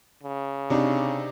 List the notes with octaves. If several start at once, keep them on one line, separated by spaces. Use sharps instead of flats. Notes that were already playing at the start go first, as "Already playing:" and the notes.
C#3
C3 D4 D#4